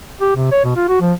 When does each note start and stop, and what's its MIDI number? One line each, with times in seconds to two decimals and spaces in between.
0.21 0.32 67
0.36 0.50 48
0.52 0.64 73
0.65 0.74 47
0.76 0.85 65
0.89 0.98 66
1.01 1.13 53